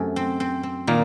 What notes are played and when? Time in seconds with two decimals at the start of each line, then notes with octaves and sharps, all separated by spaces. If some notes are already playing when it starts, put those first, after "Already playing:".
Already playing: F#2 C3 A3
0.16 C4
0.40 C4
0.63 C4
0.87 A#2 D#3 A#3